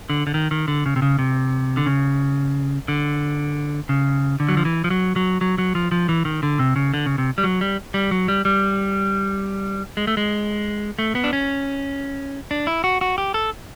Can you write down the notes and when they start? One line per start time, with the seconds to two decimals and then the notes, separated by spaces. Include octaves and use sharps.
0.10 D3
0.27 D3
0.34 D#3
0.51 D#3
0.68 D3
0.86 C#3
0.96 C3
1.02 C#3
1.19 C3
1.77 D3
1.86 C#3
2.88 D3
3.89 C#3
4.40 D3
4.49 F#3
4.57 F3
4.65 E3
4.84 F3
4.90 F#3
5.16 F#3
5.41 F#3
5.58 F#3
5.75 F3
5.92 F3
6.09 E3
6.25 D#3
6.43 D3
6.59 C3
6.76 C#3
6.94 D3
7.06 C#3
7.18 C3
7.38 G3
7.44 F#3
7.61 G3
7.94 G3
8.11 F#3
8.28 G3
8.45 G3
9.97 G#3
10.07 A3
10.17 G#3
10.99 A3
11.15 B3
11.24 D4
11.33 C#4
12.51 D4
12.67 E4
12.84 F#4
13.01 F#4
13.18 G4
13.34 A4